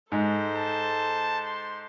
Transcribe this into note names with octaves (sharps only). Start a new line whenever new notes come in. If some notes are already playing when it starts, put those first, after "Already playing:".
G#2 G#3 A4 C5
A5
C6